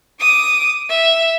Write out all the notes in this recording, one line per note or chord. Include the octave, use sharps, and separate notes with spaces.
D6 D#6
E5